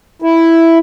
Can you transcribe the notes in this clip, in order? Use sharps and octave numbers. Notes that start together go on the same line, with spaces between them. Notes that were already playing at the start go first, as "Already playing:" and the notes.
E4